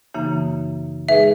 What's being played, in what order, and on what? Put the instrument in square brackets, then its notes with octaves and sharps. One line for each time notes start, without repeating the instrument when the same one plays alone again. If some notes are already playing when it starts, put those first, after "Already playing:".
[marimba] F#2 C#3 E3 A#3 D#4
[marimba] A#2 G#3 D#4 G#4 B4 [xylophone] E5